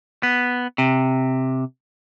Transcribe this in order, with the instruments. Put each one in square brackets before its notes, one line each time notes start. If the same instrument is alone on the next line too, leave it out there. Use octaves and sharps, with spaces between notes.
[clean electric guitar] B3
C3